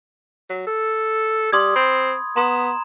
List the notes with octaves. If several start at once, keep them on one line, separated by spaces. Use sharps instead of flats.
F#3
A4
G3 C6 D#6 G#6
C4 B5
B3 A#5 C6 E7